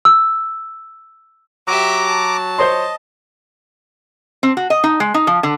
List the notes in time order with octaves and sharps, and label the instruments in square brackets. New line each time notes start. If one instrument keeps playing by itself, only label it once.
[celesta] E6
[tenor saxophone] F#3 [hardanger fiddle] G4 E5 [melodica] A#5 D6
[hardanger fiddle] A5
[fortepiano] C5 C#5 C6 [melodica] D#5
[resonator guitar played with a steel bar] C4
F#4
D#5
D#4
G#3
D#4
F3
D3